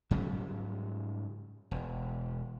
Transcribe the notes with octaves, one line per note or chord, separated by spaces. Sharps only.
G#2 C#3 F#3 G3
E1